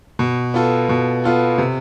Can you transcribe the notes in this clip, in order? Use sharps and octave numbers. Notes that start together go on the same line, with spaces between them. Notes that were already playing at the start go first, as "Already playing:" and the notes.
B2
B3 F4 A4
B2
B3 F4 A4
C3